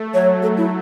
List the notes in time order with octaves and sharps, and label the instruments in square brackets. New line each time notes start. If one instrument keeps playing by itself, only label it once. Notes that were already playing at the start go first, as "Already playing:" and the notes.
Already playing: [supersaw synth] A3
[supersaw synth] F#3 [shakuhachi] C#5
[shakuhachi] A4
E4